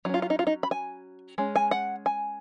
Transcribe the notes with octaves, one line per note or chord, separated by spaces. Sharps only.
F#3 C#4 D#4 F4
F4
D#4
F4
D#4
B5
G#5
G#3 C#4
G#5
F#5
G#5